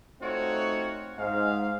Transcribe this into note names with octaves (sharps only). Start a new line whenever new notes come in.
A3 C4 D#4 F4 F#4 C#5
G#2 F5